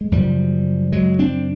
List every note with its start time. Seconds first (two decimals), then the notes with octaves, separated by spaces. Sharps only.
0.01 G#3
0.12 F#2 C#3 F3 G3
0.92 F#3 G#3
1.19 C4 D4